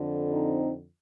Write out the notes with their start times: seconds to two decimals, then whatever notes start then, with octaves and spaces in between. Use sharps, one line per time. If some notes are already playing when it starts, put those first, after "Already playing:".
Already playing: F2 D3 F3
0.33 C4 D#4